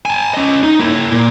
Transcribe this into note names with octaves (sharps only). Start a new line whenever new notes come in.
G#5 A5
C#4 D#5
D#4
A#3 E4
A#2